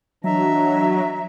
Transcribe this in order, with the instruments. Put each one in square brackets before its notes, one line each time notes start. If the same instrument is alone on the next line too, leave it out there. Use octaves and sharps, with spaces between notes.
[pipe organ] E3 D4 D#5 [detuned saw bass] F#3 [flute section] E5 A#5